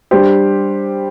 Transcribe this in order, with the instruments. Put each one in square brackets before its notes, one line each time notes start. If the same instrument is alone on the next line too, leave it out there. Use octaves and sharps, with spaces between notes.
[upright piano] G3 D4 G4 C5